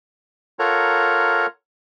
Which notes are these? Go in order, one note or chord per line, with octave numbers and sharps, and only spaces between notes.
F4 A4 A#4 C#5 F#5 A#5